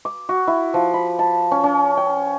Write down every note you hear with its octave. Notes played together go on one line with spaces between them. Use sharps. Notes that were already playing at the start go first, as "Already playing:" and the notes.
D6
F#4
E4
F3
B5
A5
C#4
C#4
G5